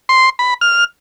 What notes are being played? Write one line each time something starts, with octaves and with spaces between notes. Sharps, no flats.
C6
B5
F6